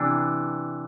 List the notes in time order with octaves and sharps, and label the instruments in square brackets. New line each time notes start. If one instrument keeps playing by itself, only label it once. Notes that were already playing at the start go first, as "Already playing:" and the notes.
Already playing: [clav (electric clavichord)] C3 E3 B3 D4